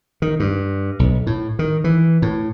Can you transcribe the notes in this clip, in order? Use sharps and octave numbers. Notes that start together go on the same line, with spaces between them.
D#3
G2
B1
A2
D#3
E3
A2